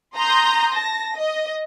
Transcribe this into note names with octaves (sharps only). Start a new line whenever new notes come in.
A#5 C6 D#6 G6 A#6
A5 A#6
D#5